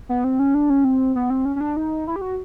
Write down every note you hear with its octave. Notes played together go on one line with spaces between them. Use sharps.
B3
C4
C#4
D4
C#4
C4
B3
C4
C#4
C#4
D4
D#4
E4
G4
F#4